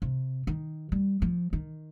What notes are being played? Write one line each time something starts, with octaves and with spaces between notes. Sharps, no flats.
C3
D#3
G3
F3
D#3